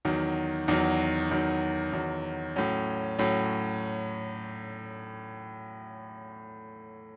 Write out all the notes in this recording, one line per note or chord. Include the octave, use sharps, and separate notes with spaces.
E2 D#3 F#3
E2 D#3 F#3
E2 D#3 F#3
E2 D#3 F#3
A2 F#3 C#4
A2 F#3 C#4